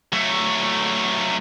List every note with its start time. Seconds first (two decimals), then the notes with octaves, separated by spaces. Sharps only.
0.12 F#3 A3